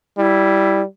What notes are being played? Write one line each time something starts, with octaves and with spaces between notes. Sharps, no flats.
G3 E4